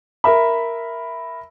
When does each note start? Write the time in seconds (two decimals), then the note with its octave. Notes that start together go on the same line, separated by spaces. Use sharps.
0.24 A#4 E5 B5